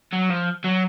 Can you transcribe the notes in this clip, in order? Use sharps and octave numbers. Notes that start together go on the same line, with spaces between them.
F#3
F3
F#3